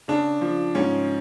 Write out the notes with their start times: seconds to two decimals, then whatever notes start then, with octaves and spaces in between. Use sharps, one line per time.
0.08 C#3 D4
0.41 F3
0.75 G#2 C#4